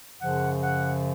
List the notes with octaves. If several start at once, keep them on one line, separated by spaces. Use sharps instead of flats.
F#2 C#3 F3 F#5
F#5